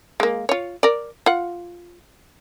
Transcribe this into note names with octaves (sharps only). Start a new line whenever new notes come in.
G#3 A#3
F4 C#5
A#4 D5
F4 F#5